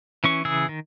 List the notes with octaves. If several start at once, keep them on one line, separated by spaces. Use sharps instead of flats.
E3 C#4 C#6
C#3 E3 G#4 E6
D#3